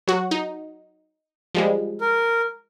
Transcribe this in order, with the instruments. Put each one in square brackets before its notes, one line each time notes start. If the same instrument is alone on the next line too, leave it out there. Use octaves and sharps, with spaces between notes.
[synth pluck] F#3 F#4
D#4
F3 G3 G#3
[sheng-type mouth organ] A#4